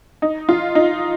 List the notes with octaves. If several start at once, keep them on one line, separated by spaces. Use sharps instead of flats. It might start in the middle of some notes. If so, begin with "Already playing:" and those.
D#4
F4
D#4